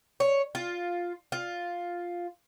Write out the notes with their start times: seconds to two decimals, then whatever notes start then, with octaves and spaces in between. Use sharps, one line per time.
0.20 C#5
0.55 F4
1.32 F4